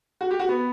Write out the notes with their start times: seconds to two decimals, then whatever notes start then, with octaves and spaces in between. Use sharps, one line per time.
0.21 F#4
0.31 G4
0.39 F#4
0.49 B3